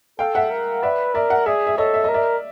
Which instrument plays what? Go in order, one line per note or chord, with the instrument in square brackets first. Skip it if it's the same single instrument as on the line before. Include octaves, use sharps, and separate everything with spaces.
[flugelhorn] A4 [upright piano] F5 G5
[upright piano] E5 F#5
[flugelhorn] A#4
[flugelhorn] B4 [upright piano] D5 E5
[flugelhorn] A#4 [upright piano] D5 E5
[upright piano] E5 F#5
[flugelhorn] G#4 [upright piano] D5 E5
[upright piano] E5
[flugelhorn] A4 [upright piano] C#5 D#5
[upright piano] E5
[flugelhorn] A#4 [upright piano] D#5
[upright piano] D5 E5